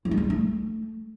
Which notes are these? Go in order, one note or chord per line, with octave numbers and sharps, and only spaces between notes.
E4
G3
C#4
D#4
A3